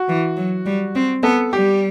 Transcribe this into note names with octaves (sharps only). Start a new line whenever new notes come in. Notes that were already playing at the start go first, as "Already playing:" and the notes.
Already playing: F#4
E3
F#3
G3
C4
B3 A4
G3 G4